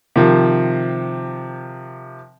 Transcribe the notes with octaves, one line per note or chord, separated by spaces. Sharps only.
C3 D#3 F3